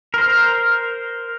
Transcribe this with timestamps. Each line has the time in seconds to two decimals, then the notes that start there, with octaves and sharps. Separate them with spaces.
0.14 A#4 C5